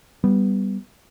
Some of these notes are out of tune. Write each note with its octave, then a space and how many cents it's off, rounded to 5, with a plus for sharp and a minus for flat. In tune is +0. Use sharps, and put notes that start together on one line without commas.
G3 +0 B3 +0